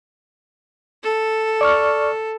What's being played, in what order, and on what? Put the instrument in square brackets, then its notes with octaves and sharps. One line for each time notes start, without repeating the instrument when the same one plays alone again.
[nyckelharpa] A4
[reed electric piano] D5 C#6 F6